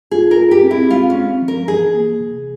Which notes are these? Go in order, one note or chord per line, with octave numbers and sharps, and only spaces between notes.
F4 G#4
A#4
G#4
G4
C4
E4
G#3 F4
C#4
C4
F3
A#4
E3 G#4
A#3
C3